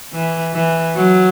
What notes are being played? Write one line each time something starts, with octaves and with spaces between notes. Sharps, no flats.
E3
E3
F#3